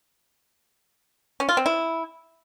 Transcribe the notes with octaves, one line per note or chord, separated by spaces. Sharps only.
C#4
F4
C4
E4